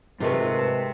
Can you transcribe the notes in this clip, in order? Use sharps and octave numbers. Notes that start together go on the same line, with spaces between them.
G#2 C3 G#3 A3 F4 A#4 B4
A5